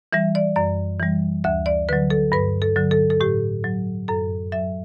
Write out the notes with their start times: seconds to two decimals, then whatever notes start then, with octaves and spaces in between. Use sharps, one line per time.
0.13 E3 G3 E5
0.35 D5
0.56 F#2 D5
1.00 E3 G3
1.44 D2 E5
1.66 D5
1.89 D3 F#3 B4
2.10 A4
2.32 G2 B4
2.62 A4
2.76 D3 F#3
2.91 A4
3.10 A4
3.20 A2 G4
3.64 F#3
4.08 F#2 A4
4.52 F#3 E5